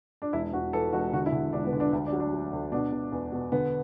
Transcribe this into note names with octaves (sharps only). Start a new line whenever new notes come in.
D4
E1 E4
E1 F#4
E3 A4
E1 F#4
D3 F#4
E4
D3
E1 D4
B3
D3
D4
D2
D4
F#3
D4
F#3
D2
B2 D4
B2
E2
B2
D3 B3